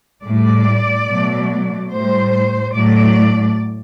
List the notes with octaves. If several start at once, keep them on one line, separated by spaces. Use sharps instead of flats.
A2 G3 D5
B2 F#3 A3
A2 G3 C5
A2 F#3 A3 D5